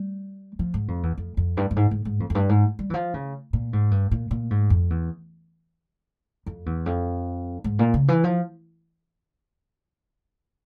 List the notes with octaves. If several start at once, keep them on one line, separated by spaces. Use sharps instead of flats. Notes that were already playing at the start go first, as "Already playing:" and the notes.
Already playing: G3
F3
G#2
F2
E2
F2
F2
G2
G2
G#2
G#2
G#2
F2
F2
G2
G#2
G3
E3
F3
C#3
A#2
G#2
G2
A#2
A#2
G#2
F2
E2
F2
E2
F2
G#2
A#2
C#3
E3
F3